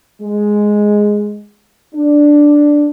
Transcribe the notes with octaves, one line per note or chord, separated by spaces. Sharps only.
G#3
D4